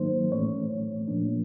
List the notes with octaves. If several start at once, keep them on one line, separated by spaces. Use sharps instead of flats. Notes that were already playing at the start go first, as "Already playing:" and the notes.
Already playing: G#2 D#3 F#3 A#3 D#4 C5
A2 E3 A3 C#4 C#5
A#2 F3 A#3 D4